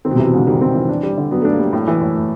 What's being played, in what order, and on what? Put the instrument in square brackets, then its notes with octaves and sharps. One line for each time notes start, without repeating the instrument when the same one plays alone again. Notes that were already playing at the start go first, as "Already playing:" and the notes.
[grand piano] D#3 [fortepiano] C4
[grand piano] B2
C3
[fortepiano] E3
[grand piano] B2
[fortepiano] G#2 [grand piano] C#3
[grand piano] D#3 [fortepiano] G3
[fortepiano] C4
E3
D4
G3
D3
[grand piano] F#3 [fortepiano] B3
[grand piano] A3
[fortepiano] D4
[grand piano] A#3
[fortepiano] G3
A2
E3
A2
A3